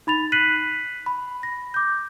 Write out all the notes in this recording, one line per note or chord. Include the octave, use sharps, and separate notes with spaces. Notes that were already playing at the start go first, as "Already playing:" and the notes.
D#4 B5 A6 F7
F#6 B6 C7 D#7 F#7
B5
A#6
D6 G6